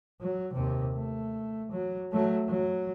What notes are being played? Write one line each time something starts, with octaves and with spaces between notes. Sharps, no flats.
F#3
D#2 C3
A3
F#3
F#3 A3
F#3